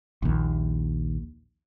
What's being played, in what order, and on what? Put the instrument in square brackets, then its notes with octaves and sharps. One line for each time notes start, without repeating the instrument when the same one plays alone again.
[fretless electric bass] A#1 D#2